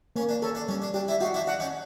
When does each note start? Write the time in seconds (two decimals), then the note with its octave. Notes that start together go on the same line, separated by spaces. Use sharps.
0.16 A#3 C#4
0.29 D4
0.42 C#4 A4
0.55 D4
0.69 G3 C#4
0.82 D4
0.94 D4 G4
1.08 D4 E4
1.20 D#4 F4 F#4
1.34 D4 E4
1.47 D4 F#5
1.60 C#4 D#4